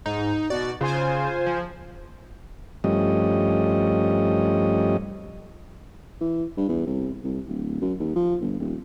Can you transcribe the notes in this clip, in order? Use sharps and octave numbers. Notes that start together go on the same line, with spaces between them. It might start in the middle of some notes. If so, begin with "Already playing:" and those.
G#2 D#4
B2 F#4 D5
C#3 F4 C5 G#5
F3
G2 F3 G3 A3 C#4 D#5
E3
G2
E2
C2
C2
D1
F#2
D#2
F3
G1
D#1